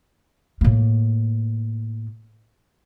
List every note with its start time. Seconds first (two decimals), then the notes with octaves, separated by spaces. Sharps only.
0.61 A2 A#3